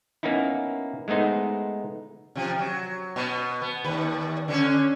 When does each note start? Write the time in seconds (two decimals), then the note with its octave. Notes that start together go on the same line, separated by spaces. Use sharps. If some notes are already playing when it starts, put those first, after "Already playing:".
0.23 A#3 B3 C#4 D#4 E4
1.08 G#3 A3 B3 D#4 C5
2.35 C3 F3
2.59 F#3
3.16 B2 B3
3.62 B3
3.84 D#2 B4
4.48 D3 E3 C#4